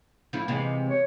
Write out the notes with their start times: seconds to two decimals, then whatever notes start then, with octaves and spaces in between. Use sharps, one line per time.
0.33 F3 A3 E4
0.48 C3 E3 G#3
0.89 C#5